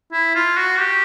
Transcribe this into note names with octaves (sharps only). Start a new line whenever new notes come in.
E4
F4
F#4
G4